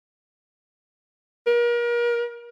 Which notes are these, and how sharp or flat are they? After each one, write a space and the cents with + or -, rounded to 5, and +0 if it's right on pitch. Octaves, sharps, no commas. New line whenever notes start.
A#4 +35